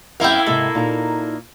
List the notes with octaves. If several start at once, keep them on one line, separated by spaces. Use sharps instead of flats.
F#2 A#3 C4 E4 F5 G5
G#2 C3 A4
A#2 D#4 A#5